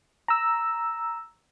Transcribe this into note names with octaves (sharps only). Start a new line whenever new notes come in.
A#5 E6